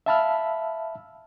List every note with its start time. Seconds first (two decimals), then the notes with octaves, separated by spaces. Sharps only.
0.06 E5 F5 A5 B5 E6 F6